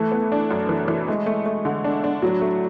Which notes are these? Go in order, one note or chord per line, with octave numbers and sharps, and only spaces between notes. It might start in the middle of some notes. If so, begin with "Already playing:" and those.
Already playing: E3 A3
B3
D4
F#2
E3
E3
G#3 A3
A3
A3
D3
D4
D4
A2 F#3
A3